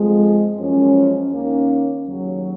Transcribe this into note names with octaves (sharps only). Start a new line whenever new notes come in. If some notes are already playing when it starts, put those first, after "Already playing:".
Already playing: F2 F3 G#3
F#2 F3 G#3 C#4
D#2 D#3 A#3 C#4
D#2 C#3 F#3